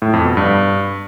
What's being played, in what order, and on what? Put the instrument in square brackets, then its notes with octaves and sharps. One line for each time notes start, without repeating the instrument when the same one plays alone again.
[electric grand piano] A2
F2
B2
G2